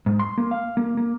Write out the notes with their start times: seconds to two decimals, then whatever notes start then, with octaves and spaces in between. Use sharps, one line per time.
0.06 G#2
0.19 C6
0.38 A#3
0.51 F5
0.77 A#3
0.97 A#3